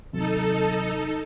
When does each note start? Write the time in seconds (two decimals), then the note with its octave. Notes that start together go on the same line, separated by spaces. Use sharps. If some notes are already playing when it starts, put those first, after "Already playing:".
0.13 D#2 C3 F#3 D#4 A4